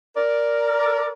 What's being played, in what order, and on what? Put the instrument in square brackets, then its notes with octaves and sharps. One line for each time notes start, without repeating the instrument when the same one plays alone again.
[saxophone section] A#4 D5